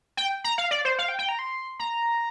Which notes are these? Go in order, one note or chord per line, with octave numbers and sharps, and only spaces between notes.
G5
A#5
F5
D5
C5
F5
G5
G5
A#5
C6
A#5